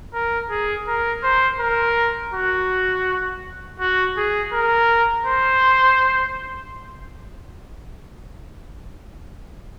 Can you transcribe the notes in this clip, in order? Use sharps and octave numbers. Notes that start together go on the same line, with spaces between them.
A#4
G#4
A#4
C5
A#4
F#4
F#4
G#4
A#4
C5